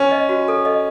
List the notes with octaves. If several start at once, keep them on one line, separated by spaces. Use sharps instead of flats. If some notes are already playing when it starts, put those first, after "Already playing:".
Already playing: C#4
D#5
F#4
A4
D#5